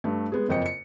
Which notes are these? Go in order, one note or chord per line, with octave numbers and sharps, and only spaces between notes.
G2 A3
G#3 B3 G#4
F#1 F2 D#5 G5 C#7
C#7